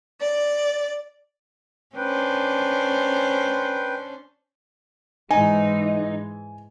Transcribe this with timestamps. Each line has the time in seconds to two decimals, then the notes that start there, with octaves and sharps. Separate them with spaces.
0.21 D5
1.96 C#4 D4 B4 C5 G5
5.31 G#2 E3 G#3 D#4 G#5